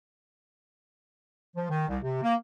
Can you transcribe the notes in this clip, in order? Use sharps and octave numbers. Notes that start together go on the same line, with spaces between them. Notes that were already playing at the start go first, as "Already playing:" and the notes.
F3
D#3
C2
C3
A#3